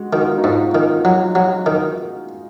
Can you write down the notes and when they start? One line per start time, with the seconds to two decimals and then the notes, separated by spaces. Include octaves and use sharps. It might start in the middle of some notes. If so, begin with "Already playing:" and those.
Already playing: G#3 F#4
0.13 D#3 F#4
0.25 F4
0.37 D#4
0.44 G#2
0.49 F4
0.75 D#3
1.05 F#3
1.35 F#3
1.66 D#3